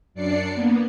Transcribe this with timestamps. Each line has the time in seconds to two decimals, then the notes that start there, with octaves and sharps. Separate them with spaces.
0.14 F#2 D4 D5 C7 C#7
0.54 A#3 B3